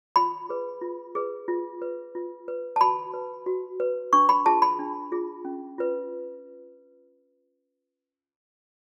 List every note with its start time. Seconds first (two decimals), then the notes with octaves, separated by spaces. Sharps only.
0.16 F4 B5
0.49 G#4 B4
0.82 F4
1.15 G#4 B4
1.48 F4
1.82 B4
2.15 F4
2.48 B4
2.76 A5
2.81 F#4 B5
3.14 B4
3.46 F#4
3.80 B4
4.13 D4 C#6
4.29 B5
4.46 F4 G#4 A5
4.62 B5
4.79 D4
5.12 F4 G#4
5.45 C#4
5.78 F4 B4